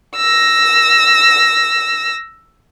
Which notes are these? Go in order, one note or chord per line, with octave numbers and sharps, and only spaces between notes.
E6 A#6